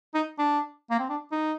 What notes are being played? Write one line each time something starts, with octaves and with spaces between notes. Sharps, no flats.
D#4
D4
A#3
C4
D4
D#4